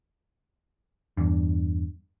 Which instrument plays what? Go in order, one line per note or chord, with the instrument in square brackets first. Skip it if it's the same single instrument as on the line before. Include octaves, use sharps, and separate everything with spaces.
[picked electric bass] E2 G2